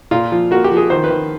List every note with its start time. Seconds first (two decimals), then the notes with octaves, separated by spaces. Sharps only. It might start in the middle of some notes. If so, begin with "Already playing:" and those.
0.11 A#2 F4
0.32 F3
0.51 A#3 F#4
0.64 G4
0.71 F3
0.77 G#4
0.90 D#3 C5
1.04 B4
1.10 D#3